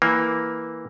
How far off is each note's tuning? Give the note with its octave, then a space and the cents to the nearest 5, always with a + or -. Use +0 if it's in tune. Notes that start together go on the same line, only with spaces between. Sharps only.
E3 -5 A#3 +0